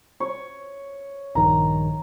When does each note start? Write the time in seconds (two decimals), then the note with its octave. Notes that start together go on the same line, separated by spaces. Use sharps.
0.20 C#5
1.35 A#1 G2 D#3 A#5